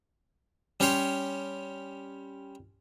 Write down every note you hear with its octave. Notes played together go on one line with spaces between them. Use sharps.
G3 C#4 G4 C#5 C6